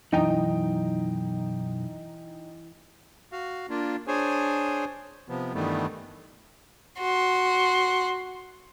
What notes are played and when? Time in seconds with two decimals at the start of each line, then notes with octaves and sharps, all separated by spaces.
0.12 B1 F#2 E3 D#4 D#5 G5
3.32 F#4 F5
3.70 A#3 D4 F4
4.07 D4 G#4 C5 C#5 G#5
5.29 C3 F3 B3
5.54 G2 D#3 E3 G3 A3 B3
7.00 F#4 C6